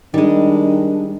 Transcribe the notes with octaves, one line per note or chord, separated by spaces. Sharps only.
D#3 G3 G#3 D4